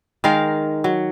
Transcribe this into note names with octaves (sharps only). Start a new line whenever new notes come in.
D#3 G#3 A#4 F5
F#3